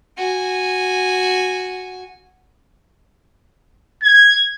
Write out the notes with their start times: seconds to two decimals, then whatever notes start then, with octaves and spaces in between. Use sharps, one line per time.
0.18 F#4 G#5
4.03 G#6